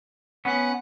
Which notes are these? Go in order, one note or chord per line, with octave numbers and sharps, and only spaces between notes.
B3 C#4 F#5